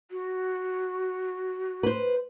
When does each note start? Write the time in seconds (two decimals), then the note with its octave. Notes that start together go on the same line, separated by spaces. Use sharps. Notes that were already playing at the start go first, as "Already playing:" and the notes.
0.11 F#4
1.83 B4 C5